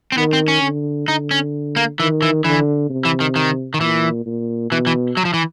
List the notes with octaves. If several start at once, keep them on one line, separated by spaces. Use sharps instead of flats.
C4
D#3 B3
C4
C#4
D3
D3 D#4
C#4
A#3
D#3 E3
E3
D3 E3
C3
E3
D#3
D#3
D#3
A#2 E3
A#2
B2 E3
E3
F#3
F3
E3